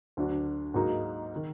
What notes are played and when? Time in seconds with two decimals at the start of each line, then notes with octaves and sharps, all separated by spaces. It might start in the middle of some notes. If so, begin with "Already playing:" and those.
0.17 D2 D3 F#3 D4 F#4
0.74 G#2 F#3 A#3 D#4 F#4
1.36 D#3